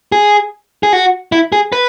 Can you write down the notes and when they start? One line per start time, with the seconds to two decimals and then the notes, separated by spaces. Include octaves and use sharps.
0.12 G#4
0.83 G#4
0.93 F#4
1.32 E4
1.52 G#4
1.72 B4